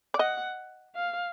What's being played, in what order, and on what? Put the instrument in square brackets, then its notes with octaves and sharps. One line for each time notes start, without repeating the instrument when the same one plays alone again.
[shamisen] D5
[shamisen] D#5 [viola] F#5
[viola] F5